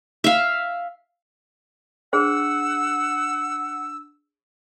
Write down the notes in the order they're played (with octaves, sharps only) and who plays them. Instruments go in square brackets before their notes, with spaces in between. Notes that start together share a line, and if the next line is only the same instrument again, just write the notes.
[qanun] E5 F5
[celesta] D4 [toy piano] G#4 C5 [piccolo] F#5 [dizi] E6